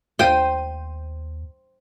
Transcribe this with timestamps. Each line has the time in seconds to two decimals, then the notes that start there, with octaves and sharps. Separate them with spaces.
0.19 D#2 F4 C5 G5 D#7